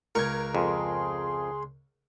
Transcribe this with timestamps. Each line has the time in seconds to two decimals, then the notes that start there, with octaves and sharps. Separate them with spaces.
0.15 C#2 A#4 C#6 G#6
0.55 F2 G#4 C6